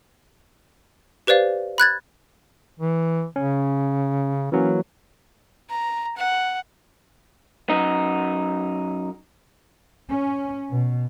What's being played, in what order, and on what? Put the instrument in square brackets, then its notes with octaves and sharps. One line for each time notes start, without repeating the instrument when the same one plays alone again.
[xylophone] G4 B4 C5 D5 F5
B5 F#6 G#6 A6
[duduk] E3
[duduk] C#3 [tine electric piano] C#4
[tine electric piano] E3 F#3 A#3 [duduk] C#4
[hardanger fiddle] A#5
F#5
[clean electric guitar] F#2 D#4
[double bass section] C#4
B2